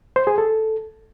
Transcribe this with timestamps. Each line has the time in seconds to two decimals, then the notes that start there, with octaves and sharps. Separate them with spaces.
0.16 C5
0.27 G#4
0.38 A4